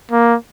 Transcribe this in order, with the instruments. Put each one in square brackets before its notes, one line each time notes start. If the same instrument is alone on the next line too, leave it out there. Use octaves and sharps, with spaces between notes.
[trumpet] A#3